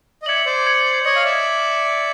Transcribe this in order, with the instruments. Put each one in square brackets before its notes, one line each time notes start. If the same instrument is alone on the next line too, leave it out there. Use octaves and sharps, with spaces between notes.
[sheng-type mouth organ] D#5
[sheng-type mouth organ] D5 E5 [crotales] G#6 C#7 F#7
[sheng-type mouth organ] C5 D5
[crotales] G#6 C#7 F#7
[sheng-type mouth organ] C#5 D#5 [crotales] G#6 C#7 F#7
[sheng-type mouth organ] F5
D5 E5